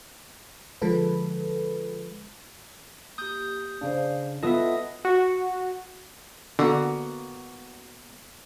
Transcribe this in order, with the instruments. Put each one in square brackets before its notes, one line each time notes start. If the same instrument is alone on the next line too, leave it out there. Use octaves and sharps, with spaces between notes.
[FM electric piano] D3 F3 G#3 A4 B4
[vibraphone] A#3 G4 [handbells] D#6 G6
[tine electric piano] C#3 D4 [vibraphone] C5 D5 F5
[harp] B3 F4 [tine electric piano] A4 E5 [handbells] D#5 D#6 [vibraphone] F#5
[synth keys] F#4
[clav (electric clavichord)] D3 [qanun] A#3 B3 F#4